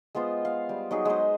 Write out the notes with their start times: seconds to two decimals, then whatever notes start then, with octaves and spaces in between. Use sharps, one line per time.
0.15 G#3 B3 F4 C5
0.45 F5
0.69 G3
0.91 F#3 D#4 G#4
1.05 G#3 B4 C5